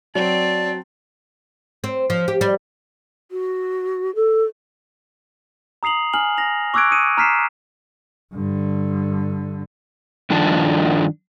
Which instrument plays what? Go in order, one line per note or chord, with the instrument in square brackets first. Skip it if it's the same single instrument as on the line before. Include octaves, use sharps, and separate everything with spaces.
[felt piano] F#3 [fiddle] C4 [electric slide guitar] D5 [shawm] A5
[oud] C4
F3
G4
G3
[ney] F#4
A4
[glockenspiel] A#5 D#6 C7 F7 F#7
G#5 F6 F#7
A#6 F7
C#6 D6 E6 F#6 G#6 D7
D#6 C#7 D#7
A#5 F6 B6 C7 E7
[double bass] G2 D3
[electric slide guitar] G2 D#3 F3 D4 A5